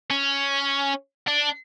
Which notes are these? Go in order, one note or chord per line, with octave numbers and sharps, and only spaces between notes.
C#4
D4